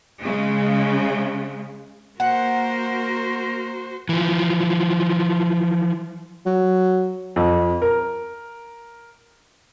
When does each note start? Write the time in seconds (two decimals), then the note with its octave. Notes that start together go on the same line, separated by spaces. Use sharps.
0.23 C#3 G#3
2.20 A#3 F#4 A#4 C5 F#5
4.09 E3 F3
6.46 F#3
7.36 F2
7.82 A#4